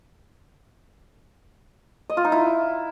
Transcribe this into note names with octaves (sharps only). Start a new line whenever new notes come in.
D#5
F4
D#4
E4